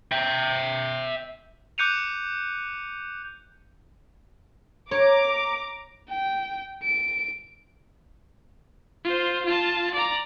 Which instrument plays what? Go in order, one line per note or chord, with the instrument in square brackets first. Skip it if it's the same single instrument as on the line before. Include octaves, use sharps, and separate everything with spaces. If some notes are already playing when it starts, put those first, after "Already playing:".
[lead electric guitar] E5 G5
[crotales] D6 F#6 G6 C#7 D#7 F7
[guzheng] C#5 [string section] A#5 D6
[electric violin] G5
D7
F4 C5
F4 A5
D5 A#5